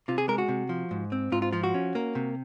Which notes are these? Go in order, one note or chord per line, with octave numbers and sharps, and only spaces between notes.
C3 F4
G#4
G#3 A#4
F#4
C3
F3
G#2
C4
G#2 F4
F4
F3 F4
F#4
C#4
A#3
C3